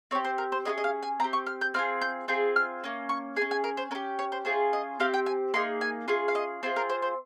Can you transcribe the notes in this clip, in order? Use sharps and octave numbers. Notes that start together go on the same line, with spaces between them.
C4 G4 C#5
C5
A#4
C5
C#4 F4 G#4 D#5
D#5
F5
G#5
C4 G4 A#5
C#6
F6
G6
C4 F4 G#4 F6
G6
C4 F4 G#4 G6
F6
A#3 C#4
C#6
G#4 G#5
C#4
G#5
A#4
C5
C#4 G4 A#4
C#5
C5
C#4 F4 G#4 C5
D#5
C4 G4 F5
G5
G#5
A#3 D#4 G#4 C6
G#5
C#4 F4 G#4
F5
D#5
C4 F4 G#4 C5
A#4
C5
C5